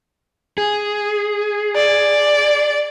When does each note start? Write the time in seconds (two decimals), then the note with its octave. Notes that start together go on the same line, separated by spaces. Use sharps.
0.58 G#4
1.75 D5